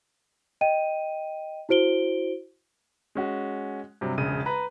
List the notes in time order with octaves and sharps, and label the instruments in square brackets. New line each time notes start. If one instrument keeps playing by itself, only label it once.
[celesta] D#5 G5 D#7
E4 F#4 C5 D7 G7
[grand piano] G#3 C#4 F#4
G2 C3 F#3
E1 A#1 C#3 D#7
B4 A#5 B5